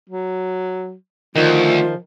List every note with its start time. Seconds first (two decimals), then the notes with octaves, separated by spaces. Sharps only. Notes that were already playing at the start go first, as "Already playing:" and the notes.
0.10 F#3
1.36 D2 D#3 F3 F4